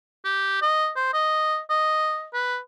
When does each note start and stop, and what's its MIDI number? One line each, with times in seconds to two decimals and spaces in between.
0.25 0.61 67
0.62 0.90 75
0.96 1.13 72
1.14 1.59 75
1.70 2.26 75
2.34 2.58 71